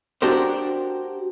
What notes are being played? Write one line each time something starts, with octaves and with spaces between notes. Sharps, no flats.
D4 F#4 G4 A#4 C5